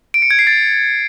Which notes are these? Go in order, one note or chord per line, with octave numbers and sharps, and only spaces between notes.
D7
C#7
G#6
C7
A6